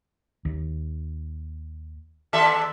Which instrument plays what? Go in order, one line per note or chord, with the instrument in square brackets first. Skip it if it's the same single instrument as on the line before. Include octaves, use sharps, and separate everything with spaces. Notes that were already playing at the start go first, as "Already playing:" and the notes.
[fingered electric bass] D#2
[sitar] D#2 A4 E5